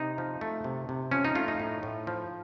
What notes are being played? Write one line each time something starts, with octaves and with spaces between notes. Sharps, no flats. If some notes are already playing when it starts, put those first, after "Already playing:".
Already playing: C3 D#4
F3
A3
C3
C3
F3 C#4
D#4
A3 F4
D#4
A2
A2
F3